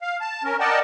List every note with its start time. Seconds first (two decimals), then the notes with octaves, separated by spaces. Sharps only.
0.01 F5
0.21 A5
0.44 C#4 A#4
0.60 A#4 D5 D#5 F#5 G5 A5